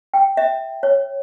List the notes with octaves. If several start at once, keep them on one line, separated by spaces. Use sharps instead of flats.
G5
E5
C#5